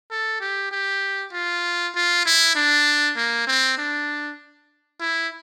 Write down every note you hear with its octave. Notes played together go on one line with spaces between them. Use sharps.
A4
G4
G4
F4
F4
E4
D4
A#3
C4
D4
E4